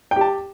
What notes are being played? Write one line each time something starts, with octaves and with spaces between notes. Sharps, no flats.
G4 G5 A5